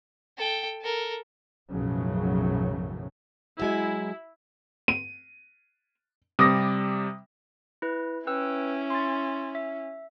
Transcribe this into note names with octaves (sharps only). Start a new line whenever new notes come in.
A4 G5
A4 A#4
B1 F#2 A2 C#3 F3 F#3
F#3 G#3 E4 G#5
D#7
C3 G3 D6 D#6 A#6
E4 B4
C#4 E4 B4 G5 E6
C6 A6
E5